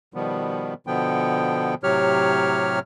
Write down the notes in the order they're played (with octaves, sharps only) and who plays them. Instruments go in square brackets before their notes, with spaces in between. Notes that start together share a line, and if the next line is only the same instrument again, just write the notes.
[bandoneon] B2 D#3 F3 G3 B3
B2 D3 F3 B3 G5
A2 C3 F#3 G4 C#5 F6